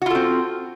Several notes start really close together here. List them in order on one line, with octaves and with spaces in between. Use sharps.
F#4 F4 A4 C4